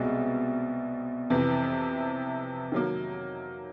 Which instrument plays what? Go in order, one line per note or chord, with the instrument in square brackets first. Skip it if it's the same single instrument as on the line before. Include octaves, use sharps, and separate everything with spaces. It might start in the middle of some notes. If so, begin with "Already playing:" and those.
Already playing: [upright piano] C2 B2 G#3
F2 C3 E3
D#3 F#3 A#3